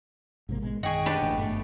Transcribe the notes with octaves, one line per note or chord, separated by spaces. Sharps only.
A1 G#2 C3 A#3
B2 G#3
F#2 D#3 G#4 D#5 F#5 G5 C#6
D4 G4 B4
G1 A2 E3
G#1 G2 B2 A3